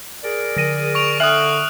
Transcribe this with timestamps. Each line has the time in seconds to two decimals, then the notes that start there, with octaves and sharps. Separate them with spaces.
0.24 G#4 A#4 D5
0.57 D3 A#6 D#7
0.95 C#6 D7 F7
1.20 D3 E5 D#6 F6 F#6 F#7